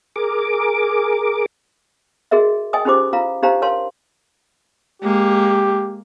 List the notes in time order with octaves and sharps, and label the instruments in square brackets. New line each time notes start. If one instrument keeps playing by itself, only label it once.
[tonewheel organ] G#4 A#4 D6
[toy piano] F#4 G#4 A#4 D#5 E5
D#5 G5 G#5 D#6
C#4 D#4 F4 G4 C5 D6
E4 F4 F5 A#5
D4 D#4 G4 C5 F5 A#5
A#4 C#5 F5 A5 C6
[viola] G#3 A#3 [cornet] G4